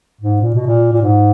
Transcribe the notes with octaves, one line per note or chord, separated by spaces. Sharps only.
G#2
A#2
B2
A#2
A#2
G#2